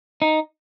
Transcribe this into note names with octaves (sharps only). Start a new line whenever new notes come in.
D#4